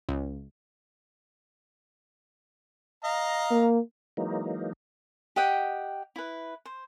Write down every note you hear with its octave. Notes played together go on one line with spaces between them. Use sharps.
C#2
D#5 F5 A#5
A#3
E3 F#3 G#3 A#3 D#4
G4 D#5 F#5 G5
E4 B4
C5